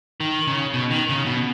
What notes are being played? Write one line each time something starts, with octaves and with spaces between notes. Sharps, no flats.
D#3
C#3
B2
D#3
C#3
B2